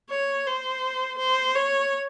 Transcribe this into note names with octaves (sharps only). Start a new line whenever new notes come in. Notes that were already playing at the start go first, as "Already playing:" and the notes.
C#5
C5
C5
C#5